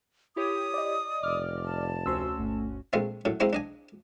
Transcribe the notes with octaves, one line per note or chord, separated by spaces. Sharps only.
E4 G4 C#5 D#6
D5 D#5
F1 D6 F6
A5
D2 C#4 F#4 C5 C6 E6
G1 A3
A#1 G#3 A3 C4
F#2 A2
G#3 A#3 C4 E4 C5
D4 D#5 G#5